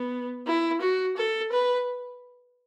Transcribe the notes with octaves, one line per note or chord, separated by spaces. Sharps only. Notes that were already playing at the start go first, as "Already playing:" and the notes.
Already playing: B3
E4
F#4
A4
B4